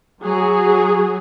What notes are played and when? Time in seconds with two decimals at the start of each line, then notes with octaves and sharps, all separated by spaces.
0.23 F#3 G#4